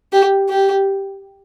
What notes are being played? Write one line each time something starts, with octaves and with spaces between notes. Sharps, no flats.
G4
G4